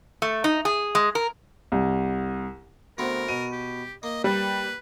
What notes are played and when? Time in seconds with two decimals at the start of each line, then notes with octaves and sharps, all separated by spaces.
0.22 A3
0.44 D#4
0.65 G#4
0.95 G#3
1.15 A#4
1.72 C2
2.98 D2 B3 C4 A#4
3.29 B2 D#7
3.52 G4
4.03 A#3 D#5
4.24 G3 B4